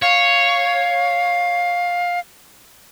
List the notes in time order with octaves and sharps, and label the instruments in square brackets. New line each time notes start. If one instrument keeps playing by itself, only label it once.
[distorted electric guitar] C#5 [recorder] F5